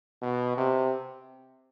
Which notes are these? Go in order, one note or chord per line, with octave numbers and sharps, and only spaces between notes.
B2
C3